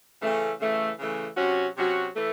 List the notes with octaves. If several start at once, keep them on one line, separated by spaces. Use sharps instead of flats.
C#3 E3 A3 C#4
C#3 E3 A3
C#3 E3 A3
C3 F#3 C#4 F#4
C3 F#3 C#4 F#4
E3 A3